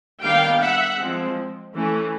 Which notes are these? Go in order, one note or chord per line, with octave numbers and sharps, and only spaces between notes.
D#3 G3 B3 D4 F5 G5
E5 F#5
F3 G#3 C4
E3 A3 C#4